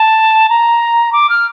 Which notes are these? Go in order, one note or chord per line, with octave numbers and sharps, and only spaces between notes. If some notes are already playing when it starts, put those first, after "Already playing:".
Already playing: A5
A#5
D6
F6